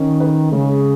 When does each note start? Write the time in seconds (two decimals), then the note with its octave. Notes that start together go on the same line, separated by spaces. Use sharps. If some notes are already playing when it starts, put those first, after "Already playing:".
Already playing: D#3 C#4
0.20 B4
0.52 C#3 G#3